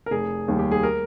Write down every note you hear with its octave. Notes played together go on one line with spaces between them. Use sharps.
A#4
F1 G#4
D#2 D#3 G3
G4
G#4
A#4